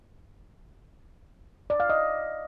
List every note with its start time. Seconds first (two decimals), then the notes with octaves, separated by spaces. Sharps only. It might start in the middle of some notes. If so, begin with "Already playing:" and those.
1.70 D5
1.80 F5
1.90 D#5